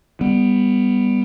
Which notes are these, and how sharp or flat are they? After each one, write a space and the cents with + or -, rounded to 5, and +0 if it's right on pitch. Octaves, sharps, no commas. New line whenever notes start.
G3 +20 B3 +0